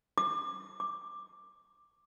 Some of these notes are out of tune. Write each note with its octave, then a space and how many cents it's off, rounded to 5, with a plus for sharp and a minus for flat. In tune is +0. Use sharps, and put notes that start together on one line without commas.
D6 +30
D6 +10